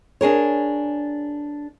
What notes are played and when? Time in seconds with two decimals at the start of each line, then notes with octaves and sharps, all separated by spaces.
0.21 D4 G#4 A#4 C#5